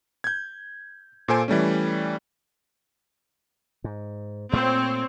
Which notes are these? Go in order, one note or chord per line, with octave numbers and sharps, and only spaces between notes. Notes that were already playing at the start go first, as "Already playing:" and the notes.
G6 G#6
A#2 A#3 A4 C5 G#5 D7
E3 G3 A3 C#4
G#2
A#2 A3 C4 C#5